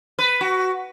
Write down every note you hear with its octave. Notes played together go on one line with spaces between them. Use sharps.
B4
F#4